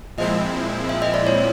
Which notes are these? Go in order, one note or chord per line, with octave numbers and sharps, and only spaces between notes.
A#2 F3 G#3 C4 E4 D#5
E5
D#5
D5
C#5